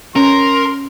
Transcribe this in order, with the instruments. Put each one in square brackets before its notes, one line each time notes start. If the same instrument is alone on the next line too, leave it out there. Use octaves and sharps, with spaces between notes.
[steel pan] C#4 [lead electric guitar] A#4 [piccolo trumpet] C6